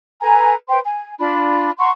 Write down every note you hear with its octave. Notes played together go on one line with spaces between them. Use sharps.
A4 B4 G#5 A#5
B4 C5 G5 C6
G#5
D4 F4 B5
F#5 A#5 C6 C#6